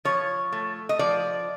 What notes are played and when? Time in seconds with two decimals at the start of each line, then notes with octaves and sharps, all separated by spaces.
0.05 F3 C#5
0.52 A3
0.89 D#5
0.99 F3 D5